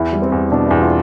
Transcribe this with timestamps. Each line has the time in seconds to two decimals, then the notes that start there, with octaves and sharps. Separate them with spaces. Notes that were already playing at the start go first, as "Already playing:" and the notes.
Already playing: E2 E4
0.13 G3
0.22 C4
0.32 E2
0.52 B2 D4
0.66 E2 E4
0.82 F4